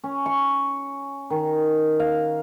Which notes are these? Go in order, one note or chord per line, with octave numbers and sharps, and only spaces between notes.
C#4
C#6
D#3
F5